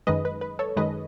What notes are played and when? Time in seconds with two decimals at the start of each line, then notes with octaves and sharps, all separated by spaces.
0.07 F#2 D#3 G#3 B4 D#5
0.25 B4
0.41 B4
0.59 A4 C#5
0.76 F#2 D#3 G#3 B4 D#5